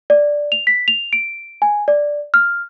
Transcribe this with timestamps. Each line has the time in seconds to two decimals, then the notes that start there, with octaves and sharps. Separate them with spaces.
0.10 D5
0.52 F7
0.67 B6
0.88 F7
1.13 D7
1.62 G#5
1.88 D5
2.34 F6